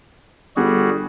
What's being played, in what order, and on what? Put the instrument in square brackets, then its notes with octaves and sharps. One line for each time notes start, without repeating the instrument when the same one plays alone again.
[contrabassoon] G1 [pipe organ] G3 F#4 G#4